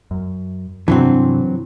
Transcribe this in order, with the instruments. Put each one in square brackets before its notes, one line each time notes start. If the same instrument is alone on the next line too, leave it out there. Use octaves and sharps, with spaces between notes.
[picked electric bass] F#2
[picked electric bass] G2 C3 D4 [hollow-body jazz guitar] E3 F#3 C4